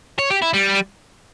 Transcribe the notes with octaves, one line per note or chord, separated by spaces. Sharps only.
C#5
G4
E4
G3